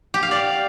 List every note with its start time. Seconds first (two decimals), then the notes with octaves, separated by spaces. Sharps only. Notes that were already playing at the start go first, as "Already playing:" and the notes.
0.14 G4
0.23 F5
0.31 D5